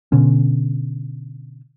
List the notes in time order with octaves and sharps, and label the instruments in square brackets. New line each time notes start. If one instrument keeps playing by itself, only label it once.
[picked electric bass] B2 D3 C#4